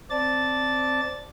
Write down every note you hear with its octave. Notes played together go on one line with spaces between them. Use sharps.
C4 D5 A5 A6